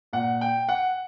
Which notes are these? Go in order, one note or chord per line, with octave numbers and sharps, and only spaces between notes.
A#2 F#5
G5
F#5